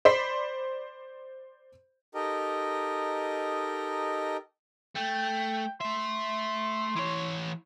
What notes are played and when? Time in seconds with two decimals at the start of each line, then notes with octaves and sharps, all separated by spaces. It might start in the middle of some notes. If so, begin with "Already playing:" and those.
0.05 C5 D5 B5 B6 C7
2.15 D#4 G4 A4 A#4 D#5
4.96 A3 G5
5.81 A3 E5 C6
6.96 E3 C#5